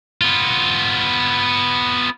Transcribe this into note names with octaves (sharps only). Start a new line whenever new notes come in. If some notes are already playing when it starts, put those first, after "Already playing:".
B3 F4